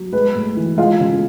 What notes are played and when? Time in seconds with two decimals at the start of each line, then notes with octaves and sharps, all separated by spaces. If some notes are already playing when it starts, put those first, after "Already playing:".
Already playing: F#3
0.13 G#3 B4
0.35 A2
0.57 E3
0.78 G#3 F4 F5
1.00 C#3